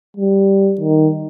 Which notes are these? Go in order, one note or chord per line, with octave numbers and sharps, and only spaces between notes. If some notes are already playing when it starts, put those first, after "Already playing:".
G3
D#3